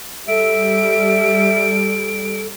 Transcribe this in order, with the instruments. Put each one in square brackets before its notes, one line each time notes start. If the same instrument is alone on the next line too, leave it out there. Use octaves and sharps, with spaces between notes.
[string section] G3 [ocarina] A4 [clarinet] E5 [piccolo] D7